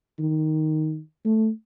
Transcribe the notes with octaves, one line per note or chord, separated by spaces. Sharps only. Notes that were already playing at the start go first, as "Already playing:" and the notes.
D#3
A3